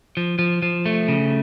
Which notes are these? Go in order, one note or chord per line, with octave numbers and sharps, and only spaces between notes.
F3
F3
F3
A3
C#3